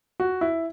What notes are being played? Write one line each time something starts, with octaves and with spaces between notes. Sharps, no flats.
F#4
E4